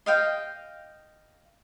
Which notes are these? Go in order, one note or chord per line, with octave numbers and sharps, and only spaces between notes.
D#5 F5 G5